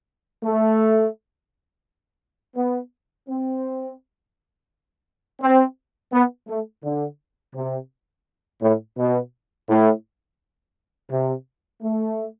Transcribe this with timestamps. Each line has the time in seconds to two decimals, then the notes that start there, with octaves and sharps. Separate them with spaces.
0.43 A3
2.57 B3
3.28 C4
5.42 C4
6.13 B3
6.48 A3
6.84 D3
7.55 C3
8.61 A2
8.97 B2
9.69 A2
11.11 C3
11.82 A3